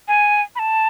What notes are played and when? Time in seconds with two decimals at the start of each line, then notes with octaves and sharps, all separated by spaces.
0.08 G#5
0.56 B5
0.59 A5